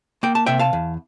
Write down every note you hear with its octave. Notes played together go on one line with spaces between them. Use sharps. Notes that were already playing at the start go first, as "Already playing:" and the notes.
A#3 G5
A5
C3 E5 G5
F5 A5
E2